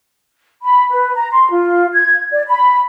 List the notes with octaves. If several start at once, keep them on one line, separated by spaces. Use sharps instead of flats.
B5
B4
A#5
C6
F4
G#6
D5
B5